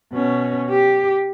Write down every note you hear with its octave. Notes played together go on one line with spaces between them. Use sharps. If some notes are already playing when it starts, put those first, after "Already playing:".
B2 C#4
G4